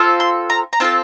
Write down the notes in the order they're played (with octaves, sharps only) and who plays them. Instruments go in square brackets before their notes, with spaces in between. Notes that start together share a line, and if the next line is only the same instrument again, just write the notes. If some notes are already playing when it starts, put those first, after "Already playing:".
Already playing: [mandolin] C4 F4 A4
C6
A#5
A#5
C4 F4 A4 A5